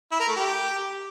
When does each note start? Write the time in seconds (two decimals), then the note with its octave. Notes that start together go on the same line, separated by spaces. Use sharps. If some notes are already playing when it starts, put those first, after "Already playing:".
0.11 E4
0.20 A#4
0.28 A3
0.36 G4